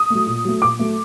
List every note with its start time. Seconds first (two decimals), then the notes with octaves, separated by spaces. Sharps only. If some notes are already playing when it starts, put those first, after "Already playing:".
Already playing: D#6
0.10 F#3 A3
0.27 A#2
0.45 F#3 A3
0.62 A#2 D6
0.79 F#3 A3